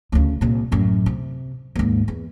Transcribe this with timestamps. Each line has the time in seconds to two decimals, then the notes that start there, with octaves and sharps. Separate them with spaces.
0.12 D2 C#3
0.41 C2 A#2
0.72 A1 F#2
1.06 C3
1.75 D#2 G#2
2.08 E2